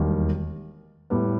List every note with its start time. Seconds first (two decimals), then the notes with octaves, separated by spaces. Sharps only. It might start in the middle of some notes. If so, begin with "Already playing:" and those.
Already playing: E1 D#2 D#3 G3
1.10 A2 G3 B3